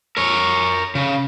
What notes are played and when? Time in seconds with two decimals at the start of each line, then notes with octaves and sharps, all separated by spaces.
0.17 A#4 C#5
0.95 C#3